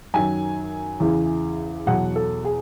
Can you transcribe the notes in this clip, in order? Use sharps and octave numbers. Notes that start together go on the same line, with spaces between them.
F#2 D#3 F#3 G#5
E2 C#3 E3
E2 B2 F#3 F#5
A4
G#4